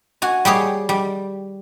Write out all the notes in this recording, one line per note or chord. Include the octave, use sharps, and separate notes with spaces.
F#4 G#5
G3 G4 G#4 C#5
G3